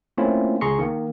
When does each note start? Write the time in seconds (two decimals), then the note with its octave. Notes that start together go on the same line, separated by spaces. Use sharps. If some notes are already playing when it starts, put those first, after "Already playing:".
0.17 A3 A#3 C4 C#4 E4 F4
0.61 C#2 G#4 A#5 C6 C#6 C#7
0.79 D#3 A#3